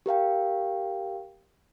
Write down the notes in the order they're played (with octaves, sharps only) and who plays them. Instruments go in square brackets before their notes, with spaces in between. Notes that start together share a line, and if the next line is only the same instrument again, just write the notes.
[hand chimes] G4 A#4 F5 G5